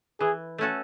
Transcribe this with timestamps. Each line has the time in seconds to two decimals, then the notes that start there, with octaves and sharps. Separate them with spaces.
0.20 E3 G#4
0.58 A3 C#4 F#4 A4